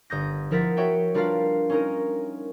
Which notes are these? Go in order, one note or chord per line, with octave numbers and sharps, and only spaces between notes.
G1 D#6 G6 A#6
F3 E4 A#4 F#5 A6 B6
F#4 C#5 E5 G5
G3 D4 F4 A#4 B4 F5
C#4 D#4 A#4